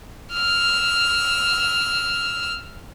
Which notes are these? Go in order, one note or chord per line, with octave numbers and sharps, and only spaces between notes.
E6 F6